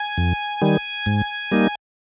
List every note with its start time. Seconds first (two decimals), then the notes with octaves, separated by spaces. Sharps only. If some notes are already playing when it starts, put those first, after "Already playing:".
Already playing: G#5
0.18 F2
0.62 D#3 G3
1.06 G#2
1.52 G3 A#3 D#4